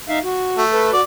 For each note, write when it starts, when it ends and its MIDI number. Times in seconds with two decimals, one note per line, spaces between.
0.08 0.19 63
0.08 0.19 76
0.08 0.19 77
0.24 0.63 66
0.57 0.89 57
0.73 0.92 69
0.73 0.92 71
0.93 1.01 66
0.93 1.03 74